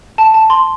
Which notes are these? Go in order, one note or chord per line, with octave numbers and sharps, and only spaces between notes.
A5
A5
C6